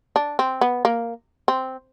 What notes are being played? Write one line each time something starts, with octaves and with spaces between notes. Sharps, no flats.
D4
C4
B3
A#3
C4